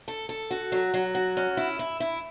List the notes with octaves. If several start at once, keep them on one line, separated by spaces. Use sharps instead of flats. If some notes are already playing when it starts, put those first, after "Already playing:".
A4
A4
F#4
F#3
F#3
F#4
C#4
E4
E4
E4